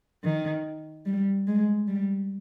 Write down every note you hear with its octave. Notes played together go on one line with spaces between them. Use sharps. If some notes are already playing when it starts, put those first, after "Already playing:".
D#3
G3
G#3
G3